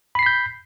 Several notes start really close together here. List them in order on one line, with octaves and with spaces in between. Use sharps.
B5 C7 B6 G6